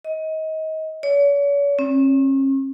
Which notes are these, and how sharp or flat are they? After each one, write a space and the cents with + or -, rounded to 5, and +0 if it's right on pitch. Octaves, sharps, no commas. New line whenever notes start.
D#5 +25
C#5 +40
C#4 -40